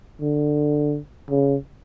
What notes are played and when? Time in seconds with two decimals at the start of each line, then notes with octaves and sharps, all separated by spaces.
0.21 D3
1.30 C#3